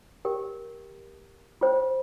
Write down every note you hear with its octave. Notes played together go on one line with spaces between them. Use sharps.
G4 A#4 G5
F4 C5 G5